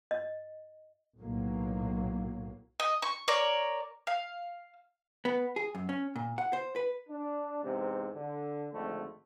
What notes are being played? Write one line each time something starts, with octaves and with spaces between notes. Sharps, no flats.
D#5
B1 A2 F#3 A#3
D#5
C#6
A#4 C#5 D5
F5
B3
G#4
F#2
C#4
A#2
F#5
C5
B4
D4
E2 G#2 C3
D3
G#1 F2 D3 A3